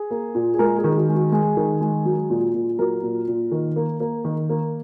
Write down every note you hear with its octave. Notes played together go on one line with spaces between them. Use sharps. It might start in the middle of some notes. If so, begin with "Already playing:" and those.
Already playing: G#4
A#3
A#2
G#4
G#3 A#4
G#4
D#3
F#4
G#3
F#4
G#3 G#4
D#3
G#3
F#3
A#2
A#2
F#3 A#4
A#2
A#2
D#3
A#3
A#3
D#3
A#3